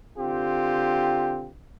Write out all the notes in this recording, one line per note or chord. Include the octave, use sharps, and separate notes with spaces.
D3 C4 F4 G4